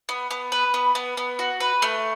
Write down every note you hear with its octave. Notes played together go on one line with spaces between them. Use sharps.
B3
B3
B4
B3
B3
B3
F#4
B4
A3